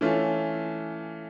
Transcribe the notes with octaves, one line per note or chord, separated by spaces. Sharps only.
E3 A3 C#4 F4